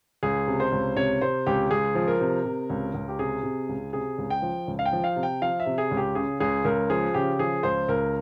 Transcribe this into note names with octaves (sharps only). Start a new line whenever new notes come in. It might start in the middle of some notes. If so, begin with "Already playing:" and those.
C#2 G#4
C3
C5
C#2
C3 C#5
C3 C5
C#2 G4
C#2 G#4
F3
A#4
C3
C3
C#2
C#2
G4
C3 G#4
C3
C#2
C3 G#4
C#2
G5
F3
C#2
F5
G5
F3
F5
C3
G5
F3 F5
E5
C3
G#4
C#2
G4
C#3 G#4
C#2 G#4
C#2 A#4
F3 G#4
C#3 G4
F3 G#4
C#2 C5
C#2 A#4